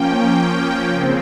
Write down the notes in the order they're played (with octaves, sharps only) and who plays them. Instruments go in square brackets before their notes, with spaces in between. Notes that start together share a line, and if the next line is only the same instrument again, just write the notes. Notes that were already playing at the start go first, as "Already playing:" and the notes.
Already playing: [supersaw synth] F3 A#3 C#4 G5
C#3 F3 C4 G5